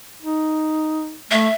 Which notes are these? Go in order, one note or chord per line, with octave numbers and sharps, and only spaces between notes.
D#4
A3 E5